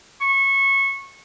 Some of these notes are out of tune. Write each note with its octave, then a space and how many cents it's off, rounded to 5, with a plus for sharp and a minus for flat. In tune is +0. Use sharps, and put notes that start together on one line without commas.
C#6 -20